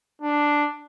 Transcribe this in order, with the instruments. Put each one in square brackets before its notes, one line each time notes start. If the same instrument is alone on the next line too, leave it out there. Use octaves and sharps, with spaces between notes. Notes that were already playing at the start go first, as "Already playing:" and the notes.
[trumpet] D4